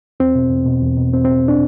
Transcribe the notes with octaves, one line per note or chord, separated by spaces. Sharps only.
E2 C4
B2
E2
B2
E2
B2
E2 C4
B2 C4
D4